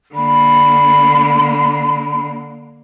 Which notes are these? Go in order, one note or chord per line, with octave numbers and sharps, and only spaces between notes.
D3 A#3 B5